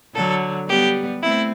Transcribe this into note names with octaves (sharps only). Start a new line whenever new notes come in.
D3 F#3 A4
G3 B3 G4
A3 C4 E4